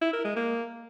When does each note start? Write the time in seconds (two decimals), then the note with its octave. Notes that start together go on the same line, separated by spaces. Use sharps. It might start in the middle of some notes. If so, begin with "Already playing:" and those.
0.01 E4
0.13 A#4
0.24 G#3
0.36 A#3